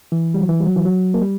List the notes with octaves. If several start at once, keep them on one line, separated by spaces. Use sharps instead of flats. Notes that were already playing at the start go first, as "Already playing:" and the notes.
E3
G3
F#3
E3
G3
F#3
E3
F#3
A#3
G3